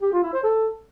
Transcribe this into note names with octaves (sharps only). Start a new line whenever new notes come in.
G4
F4
E4
C5
A4